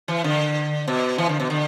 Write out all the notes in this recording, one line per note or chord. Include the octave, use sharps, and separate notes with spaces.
E3
D3
B2
E3
D3
B2
D3